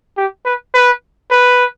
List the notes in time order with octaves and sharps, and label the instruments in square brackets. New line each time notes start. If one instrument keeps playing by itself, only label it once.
[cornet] G4
B4
B4
B4